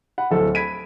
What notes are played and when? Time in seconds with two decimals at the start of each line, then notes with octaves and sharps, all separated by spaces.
0.18 F#5 B5
0.31 D1 A4
0.55 B5 G#6 B6 D7 D#7